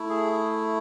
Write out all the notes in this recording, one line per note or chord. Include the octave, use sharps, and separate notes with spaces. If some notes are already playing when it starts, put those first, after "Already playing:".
Already playing: A3 E4
G#4